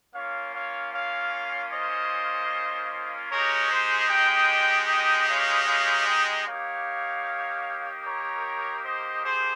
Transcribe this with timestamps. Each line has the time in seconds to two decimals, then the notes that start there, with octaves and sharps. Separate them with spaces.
0.14 A#3 C#4 F4 C#5 F5
0.54 C#5 F5
0.93 C#5 F5
1.72 C5 D#5
3.31 G#3 D#4 G4 A#4 C#5
3.70 G#4 C5
4.09 D#5 G5
4.89 D#5 G5
5.28 C#5 F5
5.68 C#5 F5
6.07 D#5 G5
6.47 A#3 D#4 G4 C#5 F5
8.06 A#4 C#5
8.84 C5 D#5
9.24 G#4 C5